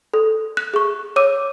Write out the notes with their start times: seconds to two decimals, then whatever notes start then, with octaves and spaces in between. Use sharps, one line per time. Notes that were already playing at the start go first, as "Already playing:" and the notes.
0.14 A4
0.57 F#6
0.74 G#4 C#6
1.16 C#5 D6 E6 D#7